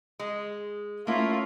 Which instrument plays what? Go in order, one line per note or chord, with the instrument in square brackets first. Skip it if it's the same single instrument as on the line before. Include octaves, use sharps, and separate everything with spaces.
[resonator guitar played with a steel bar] G#3
[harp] A3 C#4 [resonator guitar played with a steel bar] A#3 E4 [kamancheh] F4